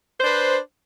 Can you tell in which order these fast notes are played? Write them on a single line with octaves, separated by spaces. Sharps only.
C5 D4 B4